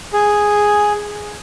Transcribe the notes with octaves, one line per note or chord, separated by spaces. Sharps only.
G#4